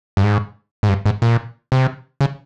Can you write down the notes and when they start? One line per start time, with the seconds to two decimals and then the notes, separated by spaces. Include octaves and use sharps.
0.17 G2
0.23 G#2
0.83 G#2
0.89 G2
1.06 G#2
1.22 A#2
1.72 C3
2.21 C#3